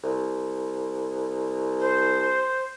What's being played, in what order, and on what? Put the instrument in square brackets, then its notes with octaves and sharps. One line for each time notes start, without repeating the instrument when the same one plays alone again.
[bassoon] C2
[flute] C5